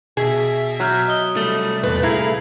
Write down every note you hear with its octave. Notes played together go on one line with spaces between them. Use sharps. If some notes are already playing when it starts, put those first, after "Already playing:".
B2 G#4 E5
F#3 A#5 F6 G6
D#5 D#6 G7
C2 G3 A3
E2 A#2 B4
E4 G#4 F5 A#5 B5 G#6 A#6